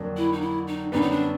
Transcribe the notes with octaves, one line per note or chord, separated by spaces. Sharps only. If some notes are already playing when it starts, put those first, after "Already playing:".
Already playing: F2 D3 F#3 A#3 D4
E4
D#4
E4
D#4
F#2 D3 G3 B3 D#4
D#4
D4